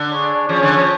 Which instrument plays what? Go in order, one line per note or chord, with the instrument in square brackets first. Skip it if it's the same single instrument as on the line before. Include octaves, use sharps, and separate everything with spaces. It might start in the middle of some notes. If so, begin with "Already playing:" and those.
Already playing: [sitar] D3
[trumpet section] D4 G#4 C#5
[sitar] F3 [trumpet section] C#4 G#4 C#5
[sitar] D3
F3